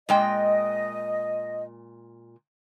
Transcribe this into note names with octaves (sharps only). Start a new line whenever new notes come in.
A#2 G#3 D#5 G5